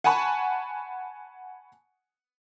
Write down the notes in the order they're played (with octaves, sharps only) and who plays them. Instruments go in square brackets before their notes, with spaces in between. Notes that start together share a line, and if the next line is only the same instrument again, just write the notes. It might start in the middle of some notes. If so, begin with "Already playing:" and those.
[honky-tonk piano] F#5 G#5 A5 B5 C#6